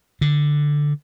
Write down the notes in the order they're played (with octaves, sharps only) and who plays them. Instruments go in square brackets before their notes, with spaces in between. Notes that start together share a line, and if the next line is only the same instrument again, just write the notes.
[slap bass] D3